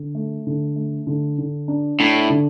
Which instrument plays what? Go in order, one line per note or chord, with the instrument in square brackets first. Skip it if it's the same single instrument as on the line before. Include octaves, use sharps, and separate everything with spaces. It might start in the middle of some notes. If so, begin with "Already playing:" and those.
Already playing: [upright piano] D3
A3
D3
A3
D3
D3
D4
[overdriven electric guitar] A2 [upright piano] D4
[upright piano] D3